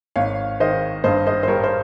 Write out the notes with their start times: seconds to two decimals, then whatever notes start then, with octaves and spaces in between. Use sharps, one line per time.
0.16 G#1 C#5 F5
0.60 D#3 C5 D#5
1.04 G2 C5 D#5
1.27 C5 D#5
1.43 C5
1.48 G3 A#4 C#5
1.64 C5